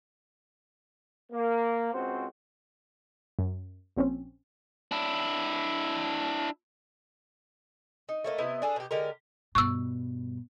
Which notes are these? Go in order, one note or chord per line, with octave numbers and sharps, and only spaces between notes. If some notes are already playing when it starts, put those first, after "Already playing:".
A#3
C#2 C4 C#4 F#4 C5
F#2
A#1 C4 C#4
D4 E4
D#4
A3 A#3 D5 D#5
C3 B3 E4 D#5
D4 G#4 A4
B2 G4
D3 G#3 G4 A#4
G2 B2 C#6 E6